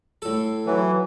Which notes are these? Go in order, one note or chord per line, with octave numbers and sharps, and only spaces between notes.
A2 A4
E3 F#3